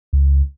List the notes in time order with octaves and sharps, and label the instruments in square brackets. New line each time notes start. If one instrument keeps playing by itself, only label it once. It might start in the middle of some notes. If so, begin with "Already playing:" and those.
[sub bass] C#2